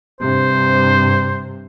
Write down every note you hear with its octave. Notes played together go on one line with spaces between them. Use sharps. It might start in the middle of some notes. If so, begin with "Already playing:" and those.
G2 C3 C5